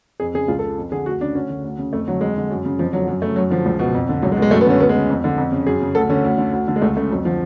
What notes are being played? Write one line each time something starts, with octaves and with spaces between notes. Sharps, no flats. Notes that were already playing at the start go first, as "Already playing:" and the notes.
F2 G#4
C#3 G#4
C#2 F4
A4
C#3
F2
D3 G#4
D2 F#4
C#3 D4
D2 C#4
D3
D2
C#3
F2 A3
D3 F#3
F2 G#3
D3
F#2
C#3
F2 F3
D3 F#3
F#2 F#3
C#3 A3
F#2 F#3
D3 F3
C#2
B2
F2
D3
C#2 F#3
G#3
B2
G#3
F#2 A3
B3
D3 C#4
D2 B3
G#3
C#3
F2
D3
F2
C#3
F#2 G#4
C#3
D2 A4
D3 C#4
D2
D3
D2
D3
G#3
C#2 A3
C#3 A3
F2 F#3
D3 F3